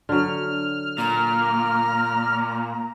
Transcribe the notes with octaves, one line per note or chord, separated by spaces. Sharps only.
D3 F#3 F6
A#2 A#5